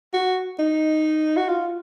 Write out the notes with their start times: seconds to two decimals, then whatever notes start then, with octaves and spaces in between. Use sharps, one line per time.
0.13 F#4
0.59 D#4
1.37 F#4
1.48 F4